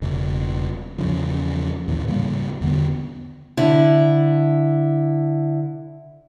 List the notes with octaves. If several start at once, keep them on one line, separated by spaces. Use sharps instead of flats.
E1 C#3
E2 C#3 F3
D#2 A2 E3
G#2 C#3 G3 A#3
E2 D3 B3
D3 E4